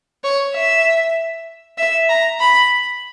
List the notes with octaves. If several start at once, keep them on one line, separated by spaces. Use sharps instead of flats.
C#5
E5
E5
A#5
B5